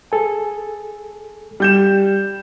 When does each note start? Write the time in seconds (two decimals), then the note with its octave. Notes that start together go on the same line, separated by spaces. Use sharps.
0.12 G#4 A4 G#5
1.60 G3 G6 E7